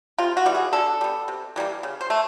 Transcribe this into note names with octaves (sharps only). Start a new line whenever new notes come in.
C3 F4
F#4
E3 G3 B3
G#4
D3 A4
G3 B3
C3
E3 G3 A#3
C#3
C5
A3